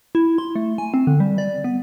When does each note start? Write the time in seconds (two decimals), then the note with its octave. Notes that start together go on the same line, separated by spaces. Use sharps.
0.15 E4
0.38 C6
0.56 A3
0.78 G#5
0.94 C4
1.07 D3
1.20 G3
1.38 D5
1.64 B3